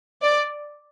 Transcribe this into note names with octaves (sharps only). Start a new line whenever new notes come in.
D5